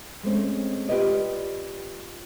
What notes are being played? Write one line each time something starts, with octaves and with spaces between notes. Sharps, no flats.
G#3 A3 C4 C#4
F4 G4 B4 D5 D#5